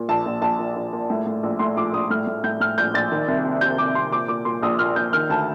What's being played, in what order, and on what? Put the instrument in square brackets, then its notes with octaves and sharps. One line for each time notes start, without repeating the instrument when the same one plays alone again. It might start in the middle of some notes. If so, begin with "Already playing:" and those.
Already playing: [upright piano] A#2
A#1 A5
A#1
A#1 A5
A#2
A#1
A#2
A2
A2
A#1
A2 C6
A#1 D6
A#1 D#6
A2 F6
A2
A2 G6
A2 F6
A#1 G6
A#1 A6
D#3
C2
C3
C3 G6
C3 D6
C3 C6
A#2 D6
A#2 D6
A#2 C6
A#1 D#6
A#2 F6
A#1 G6
D#3 F6
D2 A5